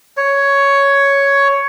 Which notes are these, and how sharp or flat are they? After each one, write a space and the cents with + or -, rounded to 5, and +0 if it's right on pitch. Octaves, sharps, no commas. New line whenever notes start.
C#5 +5